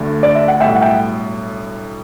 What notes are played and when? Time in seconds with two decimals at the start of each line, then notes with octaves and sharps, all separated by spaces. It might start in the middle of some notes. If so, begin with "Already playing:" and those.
Already playing: D2 D3 A3 D4
0.23 D5
0.35 E5
0.48 F#5
0.60 B1 A2 G3 E5 G5
0.75 F#5
0.81 E5 G5